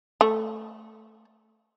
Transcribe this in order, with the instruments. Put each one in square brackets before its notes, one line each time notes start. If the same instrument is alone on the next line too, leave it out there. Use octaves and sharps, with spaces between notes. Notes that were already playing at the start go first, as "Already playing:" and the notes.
[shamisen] A3